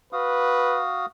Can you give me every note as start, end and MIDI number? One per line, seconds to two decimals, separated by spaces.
0.13 1.06 66
0.13 0.83 71
0.13 1.06 77
0.13 1.06 87